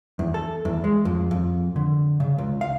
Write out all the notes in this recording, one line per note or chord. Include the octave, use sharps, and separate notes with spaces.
E2
A4
E2
G#3
F2
F2
D3
C#3
C#2
F5